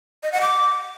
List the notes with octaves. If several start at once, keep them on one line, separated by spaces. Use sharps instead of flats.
D#5
F#5
D6